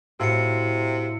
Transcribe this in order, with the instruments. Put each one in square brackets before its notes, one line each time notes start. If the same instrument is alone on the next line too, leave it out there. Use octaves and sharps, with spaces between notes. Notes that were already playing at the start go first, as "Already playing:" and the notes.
[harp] A2 [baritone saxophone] C3 [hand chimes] F#4 F5 [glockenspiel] E6 C7 C#7